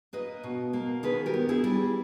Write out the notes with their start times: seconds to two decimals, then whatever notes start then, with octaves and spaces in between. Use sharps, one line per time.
0.13 A#3 B4 D#5
0.44 B2
0.73 A#3
1.03 D#3 G#4 B4
1.26 G4 A#4
1.34 B3
1.49 E4 G#4
1.64 G3